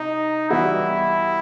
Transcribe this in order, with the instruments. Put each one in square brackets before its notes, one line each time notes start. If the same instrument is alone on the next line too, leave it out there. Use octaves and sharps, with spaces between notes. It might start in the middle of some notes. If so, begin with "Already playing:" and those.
Already playing: [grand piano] C3 [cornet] D#4
[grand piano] E3 G3 B3 F#4 [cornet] E4